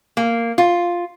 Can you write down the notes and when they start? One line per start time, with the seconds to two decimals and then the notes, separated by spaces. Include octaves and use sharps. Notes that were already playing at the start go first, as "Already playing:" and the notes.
0.17 A#3
0.58 F4